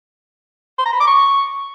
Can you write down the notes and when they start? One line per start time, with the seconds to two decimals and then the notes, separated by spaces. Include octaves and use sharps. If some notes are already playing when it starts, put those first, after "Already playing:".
0.78 C6
0.85 A#5
0.93 B5
1.00 D6
1.07 C#6